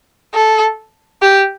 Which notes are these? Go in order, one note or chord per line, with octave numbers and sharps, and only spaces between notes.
A4
G4